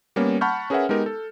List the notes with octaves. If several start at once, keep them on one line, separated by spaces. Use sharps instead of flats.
G3 A#3 B3 C#4
F#5 A5 B5 C#6 F6 G6
C#4 G#4 A#4 B4 E5 F#5
G#3 B3 D#4 G4 A#4
A4